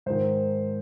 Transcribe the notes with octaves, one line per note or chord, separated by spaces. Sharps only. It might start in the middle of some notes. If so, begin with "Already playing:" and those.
G#2 D#3 C5